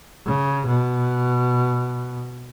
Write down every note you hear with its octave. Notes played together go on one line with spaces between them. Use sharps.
C#3
B2